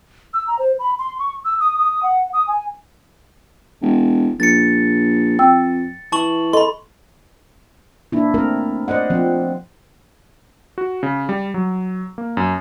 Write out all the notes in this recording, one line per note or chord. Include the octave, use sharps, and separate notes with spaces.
E6
A#5
C5
B5
C6
C#6
E6
D#6
D#6
F#5
D#6
G#5
E1
A#1 A6 C#7
F2 G5 E6
E3 A5 C#6 F#7
A4 D#5 B5 C6
A#3 D4 E4
A3 C4 A#4
C5 D5 D#5 F#5
F3 C4
F#4
C#3
G3
F#3
A#3
F#2